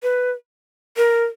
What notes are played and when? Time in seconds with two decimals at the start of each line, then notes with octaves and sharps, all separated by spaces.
0.03 B4
0.97 A#4